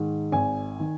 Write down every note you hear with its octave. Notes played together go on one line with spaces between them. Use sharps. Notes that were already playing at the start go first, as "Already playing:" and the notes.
Already playing: G#2 D#3
G#1 G#5
D#3